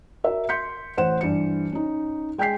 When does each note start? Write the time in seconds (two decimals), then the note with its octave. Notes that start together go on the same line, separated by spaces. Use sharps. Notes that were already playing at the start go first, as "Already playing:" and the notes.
0.24 F#4 A#4 E5
0.49 C6 G6 B6 C#7
0.97 A1 C5 F#5 E7
1.21 G2 E3 C#7
1.72 C#4 D#4
2.38 G#3 G5 G#5 G6 B6 C7